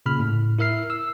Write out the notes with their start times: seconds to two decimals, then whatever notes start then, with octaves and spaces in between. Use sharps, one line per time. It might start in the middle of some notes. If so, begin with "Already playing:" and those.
0.06 A#2 C#3 B5 F6
0.20 A2
0.59 E4 A#4 E5 F6 C7
0.90 E6